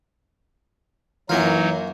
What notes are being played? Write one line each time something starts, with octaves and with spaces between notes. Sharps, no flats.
F#2 E3 F#3 A#3 D#4 F4